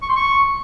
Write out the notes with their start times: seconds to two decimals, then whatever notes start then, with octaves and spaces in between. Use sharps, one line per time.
0.02 C#6
0.09 C6
0.16 C#6